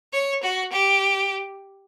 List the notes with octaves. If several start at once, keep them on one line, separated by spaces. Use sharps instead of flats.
C#5
F#4
G4